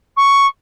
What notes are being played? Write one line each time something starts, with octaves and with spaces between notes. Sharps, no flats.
C#6